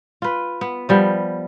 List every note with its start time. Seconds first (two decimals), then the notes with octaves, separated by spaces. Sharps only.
0.22 F4 B4
0.61 B3
0.89 F3 G3 B3